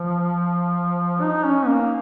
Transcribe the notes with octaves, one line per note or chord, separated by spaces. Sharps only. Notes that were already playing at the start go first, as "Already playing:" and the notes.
Already playing: F3
D#4
C#4
A#3